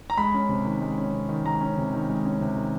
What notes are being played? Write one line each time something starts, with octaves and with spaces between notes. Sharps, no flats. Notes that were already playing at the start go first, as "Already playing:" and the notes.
A#5
G#3 B5
C#4
C3
D#3
G#3
C#4
C3
D#3
G#3 A#5
C#4
C3
D#3
G#3
C#4
C3
D#3